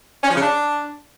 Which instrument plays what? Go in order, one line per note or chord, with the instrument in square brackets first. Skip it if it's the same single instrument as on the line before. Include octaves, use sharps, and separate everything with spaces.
[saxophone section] C#4
F3
C#3
D4